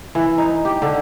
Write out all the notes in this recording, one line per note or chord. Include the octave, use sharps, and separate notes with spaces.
E3
D#4
G4
D3